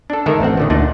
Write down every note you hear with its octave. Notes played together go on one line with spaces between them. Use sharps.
D4 A4
D3 D#3 G#3 A4 A#4 E5
A1 A3 C4 F#5
A#2 D3 D#3
D2 A#2 D4 D#4 F#5